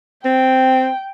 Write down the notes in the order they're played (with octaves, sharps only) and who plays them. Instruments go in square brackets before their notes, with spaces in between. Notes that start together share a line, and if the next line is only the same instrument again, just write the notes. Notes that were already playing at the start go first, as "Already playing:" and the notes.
[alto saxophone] C4 [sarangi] G5